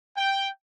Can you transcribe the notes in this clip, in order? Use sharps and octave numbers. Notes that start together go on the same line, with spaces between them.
G5